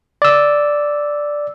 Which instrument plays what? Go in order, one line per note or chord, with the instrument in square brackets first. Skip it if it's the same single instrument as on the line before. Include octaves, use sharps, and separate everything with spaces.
[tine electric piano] D5 E6